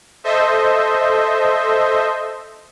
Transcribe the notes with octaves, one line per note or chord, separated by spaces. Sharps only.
A4 C5 D#5 E5